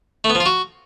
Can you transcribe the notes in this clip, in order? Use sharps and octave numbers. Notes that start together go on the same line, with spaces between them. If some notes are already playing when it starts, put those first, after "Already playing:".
A3
B3
F3
F4
F#4